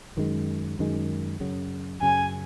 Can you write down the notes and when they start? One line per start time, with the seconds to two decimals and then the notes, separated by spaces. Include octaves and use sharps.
0.17 F#2 D#3 G#3
0.79 F#2 D#3 G#3
1.40 F#2 C#3 F#3
2.02 F#2 C#3 F#3 G#5